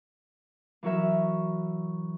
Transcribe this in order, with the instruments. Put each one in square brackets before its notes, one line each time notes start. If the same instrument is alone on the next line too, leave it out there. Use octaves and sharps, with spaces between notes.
[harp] E3 F#3 F#4 A#4 E5